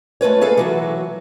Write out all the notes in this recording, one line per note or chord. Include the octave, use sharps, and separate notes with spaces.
G#3 A3 F4 B4 C#5
G#4 A4 B4 F5
E3 F#3 F#4